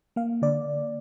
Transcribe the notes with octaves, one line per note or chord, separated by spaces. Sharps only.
A#3 F5
D3 D5